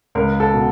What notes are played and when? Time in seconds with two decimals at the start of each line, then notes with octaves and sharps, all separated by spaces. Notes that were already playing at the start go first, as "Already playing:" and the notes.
0.15 C#2 A#4
0.40 A4
0.54 B2